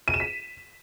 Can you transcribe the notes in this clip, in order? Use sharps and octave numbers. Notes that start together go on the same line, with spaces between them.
D#7
E7
B6